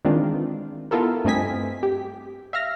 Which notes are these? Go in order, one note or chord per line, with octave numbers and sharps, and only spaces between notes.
D#3 E3 G#3 C4 D4 F4
B3 E4 F4 A4 A#4
G2 A3 C4 D#5 G#5 B6
G4
E5 F5 F6 A#6